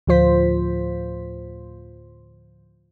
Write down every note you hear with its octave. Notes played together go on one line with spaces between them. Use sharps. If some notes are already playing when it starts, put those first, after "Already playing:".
D2 A2 F3 F4 C5 B6